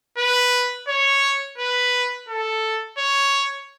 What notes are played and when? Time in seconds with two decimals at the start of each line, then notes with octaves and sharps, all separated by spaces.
0.18 B4
0.88 C#5
1.58 B4
2.28 A4
2.98 C#5